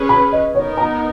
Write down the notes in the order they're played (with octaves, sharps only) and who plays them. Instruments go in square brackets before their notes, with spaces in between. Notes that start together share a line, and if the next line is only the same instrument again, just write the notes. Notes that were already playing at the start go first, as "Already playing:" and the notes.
Already playing: [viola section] C#4 G#4 B4
[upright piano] B5
D#5
[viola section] B3 D#4 A#4 [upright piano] C#5
[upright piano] A#5